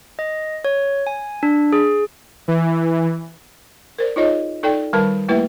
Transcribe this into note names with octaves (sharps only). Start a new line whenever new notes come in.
D#5
C#5
G#5
D4
G#4
E3
A#4 C5 D5
D#4 F4 G#4 C#5 D#5
D#4 A4 D5 G5
D#3 G3 A#4 B4 A5 B5
A3 A#3 E4 G4 B4 E5